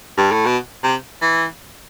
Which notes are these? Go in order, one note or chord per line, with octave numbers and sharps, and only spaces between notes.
G2
A2
B2
C3
E3